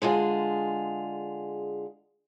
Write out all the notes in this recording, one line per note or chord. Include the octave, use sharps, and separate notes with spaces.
D3 G#3 F4 G#4